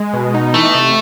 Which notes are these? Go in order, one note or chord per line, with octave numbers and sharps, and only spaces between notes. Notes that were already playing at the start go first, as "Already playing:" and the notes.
Already playing: G#3
B2
D#4
E3 A3
C3